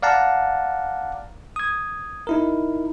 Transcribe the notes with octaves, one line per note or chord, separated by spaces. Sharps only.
D5 F5 F#5 A5 A#5
D#6 G#6
D#4 E4 A#4